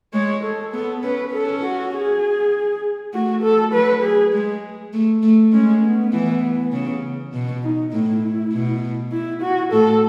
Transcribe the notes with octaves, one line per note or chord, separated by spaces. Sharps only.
G#3 C#5
A4
B3 A4
C#4 B4
C#4 A4
F#4
G#4
A3 F#4
A4
F#3 B4
G#4
G#3
A3
A3
G#3 C#4
B3
E3
C#3
B2
D#4
A2 E4
B2
E4
F#4
A2 A4